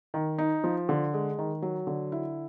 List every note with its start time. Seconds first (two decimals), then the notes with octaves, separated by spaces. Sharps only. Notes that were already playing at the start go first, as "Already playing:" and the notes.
0.14 D#3
0.38 D#4
0.64 F3
0.89 D3
1.14 G#3
1.39 D#3
1.62 F#3
1.87 D3
2.12 E4